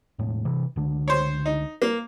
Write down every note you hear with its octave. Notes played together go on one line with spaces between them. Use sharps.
E1 A2
C3 E3
C#2 D3
C5 C#5
D#4
A#3